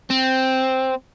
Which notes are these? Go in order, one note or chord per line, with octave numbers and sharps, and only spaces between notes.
C4